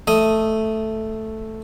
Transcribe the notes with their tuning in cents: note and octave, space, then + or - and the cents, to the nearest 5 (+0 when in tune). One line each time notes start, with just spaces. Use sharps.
A3 +0 D#5 +5